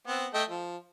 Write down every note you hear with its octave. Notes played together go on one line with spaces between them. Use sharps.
B3 C4
A3 D#5 G5
F3